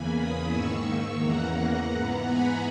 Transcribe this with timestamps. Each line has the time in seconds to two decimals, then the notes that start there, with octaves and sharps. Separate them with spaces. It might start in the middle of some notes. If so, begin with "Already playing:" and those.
Already playing: E2 C#3 E3 A#3 G#5 B5
0.16 B5 D#6
0.50 G#2 D#3 A#3 C#6 E6
1.20 E2 C#3 E3 A#3 F#5 A#5
1.90 G#2 E3 B3
2.24 G#5 B5